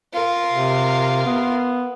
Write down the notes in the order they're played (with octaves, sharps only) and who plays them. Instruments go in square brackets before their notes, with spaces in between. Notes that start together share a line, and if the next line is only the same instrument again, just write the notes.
[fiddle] F4 A#4
[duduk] C3
B3